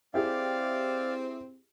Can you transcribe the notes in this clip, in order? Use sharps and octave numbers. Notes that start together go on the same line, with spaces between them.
C4 E4 G4 G#4 D5 F5